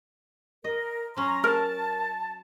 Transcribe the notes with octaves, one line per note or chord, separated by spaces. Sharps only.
A#4 D#5
F#3 C#4 A#5 C6
A#4 A5